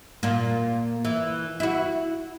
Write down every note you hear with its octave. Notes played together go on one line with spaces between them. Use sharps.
A#2 A#3
E3
E4 F#4